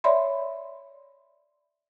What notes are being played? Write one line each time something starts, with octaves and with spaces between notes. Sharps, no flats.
C#5 D5 E5 B5 C6